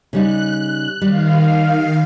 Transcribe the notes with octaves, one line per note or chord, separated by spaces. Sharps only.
C#3 G3 D#4 F#6
D#3 G3 F5